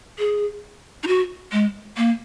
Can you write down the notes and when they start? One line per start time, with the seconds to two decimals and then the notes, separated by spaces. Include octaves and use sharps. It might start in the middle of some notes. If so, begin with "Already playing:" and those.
0.19 G#4
1.03 D#4
1.08 F#4
1.52 G#3
1.97 A#3